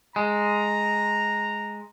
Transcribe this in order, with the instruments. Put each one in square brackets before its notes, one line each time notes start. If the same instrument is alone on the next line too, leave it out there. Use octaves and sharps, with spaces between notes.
[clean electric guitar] G#3 [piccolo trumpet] A#5